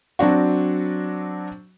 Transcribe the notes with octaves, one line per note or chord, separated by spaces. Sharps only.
F#3 C4 D4 F#4